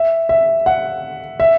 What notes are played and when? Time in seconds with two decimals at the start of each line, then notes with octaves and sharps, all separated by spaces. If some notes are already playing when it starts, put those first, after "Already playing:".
Already playing: E5
0.29 E5
0.66 F#5
1.40 E5